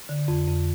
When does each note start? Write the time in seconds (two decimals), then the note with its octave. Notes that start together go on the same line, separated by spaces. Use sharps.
0.09 D3
0.28 F2
0.47 F2